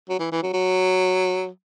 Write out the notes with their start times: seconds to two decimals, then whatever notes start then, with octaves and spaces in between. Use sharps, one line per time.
0.10 F#3
0.20 E3
0.32 E3
0.43 F#3
0.53 F#3